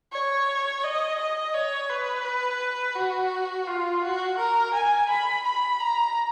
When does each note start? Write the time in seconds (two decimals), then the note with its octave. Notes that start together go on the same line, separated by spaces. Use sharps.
0.12 C#5
0.83 D#5
1.19 D#5
1.54 C#5
1.90 B4
2.96 F#4
3.67 F4
4.02 F#4
4.38 A#4
4.73 G#5
5.09 B5
5.44 B5
5.80 A#5